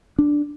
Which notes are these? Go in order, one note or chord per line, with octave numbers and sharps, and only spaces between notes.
D4